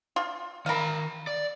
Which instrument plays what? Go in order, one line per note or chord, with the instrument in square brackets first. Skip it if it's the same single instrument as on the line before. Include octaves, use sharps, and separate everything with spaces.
[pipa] F4
[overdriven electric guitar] D#3 B5 [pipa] A#4 F5
[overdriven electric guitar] D5